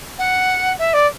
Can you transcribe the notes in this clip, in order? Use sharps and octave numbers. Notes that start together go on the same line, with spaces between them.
F#5
E5
D5